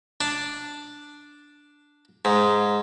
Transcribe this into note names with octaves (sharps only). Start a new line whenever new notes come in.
D4
G#2